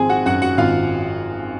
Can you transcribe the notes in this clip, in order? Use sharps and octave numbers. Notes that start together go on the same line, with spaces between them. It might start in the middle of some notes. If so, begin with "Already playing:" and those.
Already playing: G#1 F3 C4 G#4 G#5
F#4 F#5
F#2 F#4 F#5
F#4 F#5
G#1 F4 F5